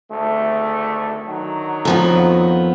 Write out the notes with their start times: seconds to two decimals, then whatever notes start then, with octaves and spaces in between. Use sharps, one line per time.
0.10 G#1 D2 A3
1.27 D3 D#3 F#3
1.85 F2 F3 B3